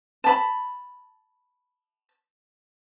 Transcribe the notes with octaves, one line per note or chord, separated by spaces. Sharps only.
A5 B5